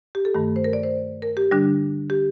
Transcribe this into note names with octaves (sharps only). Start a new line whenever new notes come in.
G4
A4
G2 D#3 A3
C5
A#4
D5
C5
A#4
G4
D3 G3 D4
G4